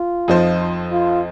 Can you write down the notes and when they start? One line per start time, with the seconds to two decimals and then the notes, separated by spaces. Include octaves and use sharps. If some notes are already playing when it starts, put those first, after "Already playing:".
Already playing: F4
0.28 F2 F3 D#4 C5
0.92 F4